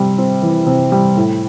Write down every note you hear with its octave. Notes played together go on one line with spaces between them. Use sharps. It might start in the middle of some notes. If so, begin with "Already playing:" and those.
Already playing: C3 G3
C4
E3
C3
G3
A2